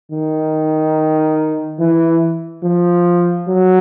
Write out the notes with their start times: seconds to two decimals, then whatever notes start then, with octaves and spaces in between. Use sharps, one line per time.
0.11 D#3
1.79 E3
2.63 F3
3.48 F#3